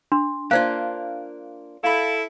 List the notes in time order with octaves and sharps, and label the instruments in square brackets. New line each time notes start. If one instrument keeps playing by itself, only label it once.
[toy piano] D4 [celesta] C6
[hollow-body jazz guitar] A#3 D4 F4 [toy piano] C5 F5 [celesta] F#6 G#6
[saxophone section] E4 A4 [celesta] F5 B5